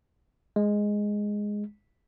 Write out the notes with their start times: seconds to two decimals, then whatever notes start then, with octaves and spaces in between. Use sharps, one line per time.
0.56 G#3